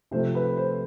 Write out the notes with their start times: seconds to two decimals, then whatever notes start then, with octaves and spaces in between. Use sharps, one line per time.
0.11 C3 F3 A3 C5
0.35 B4
0.57 C5